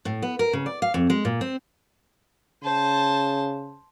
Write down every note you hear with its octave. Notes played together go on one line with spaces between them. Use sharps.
A2
B3
A#4
C#3
D5
F5
F2
G#3
A#2
C4
C#3 C5 A5